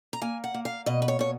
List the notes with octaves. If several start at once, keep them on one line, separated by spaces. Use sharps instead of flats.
A#5
A#3 G#5
F#5
A#3
F5
B2 D#5
B4
C#5
B2 C#5